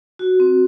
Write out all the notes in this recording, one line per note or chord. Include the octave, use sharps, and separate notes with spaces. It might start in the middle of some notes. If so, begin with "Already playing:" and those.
F#4
C4